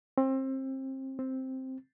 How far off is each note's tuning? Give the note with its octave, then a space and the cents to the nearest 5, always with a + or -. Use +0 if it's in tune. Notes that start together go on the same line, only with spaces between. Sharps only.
C4 +25
C4 +0